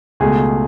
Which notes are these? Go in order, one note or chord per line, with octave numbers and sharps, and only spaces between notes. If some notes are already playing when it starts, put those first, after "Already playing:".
C#2 B2 A3 G#4